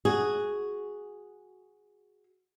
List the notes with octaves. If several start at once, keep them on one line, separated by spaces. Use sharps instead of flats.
F#4 G#4